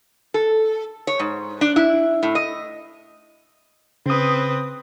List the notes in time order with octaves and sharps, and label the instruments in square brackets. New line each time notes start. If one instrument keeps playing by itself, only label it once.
[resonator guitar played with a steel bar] A4
C#5
G#2
D4
E4
A2
D#5
[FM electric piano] C#3 D#6 [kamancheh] C4 B4